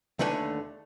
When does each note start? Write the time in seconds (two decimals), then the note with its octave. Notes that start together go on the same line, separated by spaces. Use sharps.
0.19 D#2 D3 A3 B4 G#5